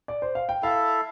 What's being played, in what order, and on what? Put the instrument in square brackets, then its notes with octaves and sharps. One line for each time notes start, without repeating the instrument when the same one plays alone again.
[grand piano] D5
C5
F5
G5
[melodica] E4 A4 E5 [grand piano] F5